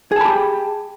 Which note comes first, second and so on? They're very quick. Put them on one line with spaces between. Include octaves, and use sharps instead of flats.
G#4 A5 B5 G4